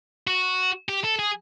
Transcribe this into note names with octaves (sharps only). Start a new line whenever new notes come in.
F#4
G4
A4
G#4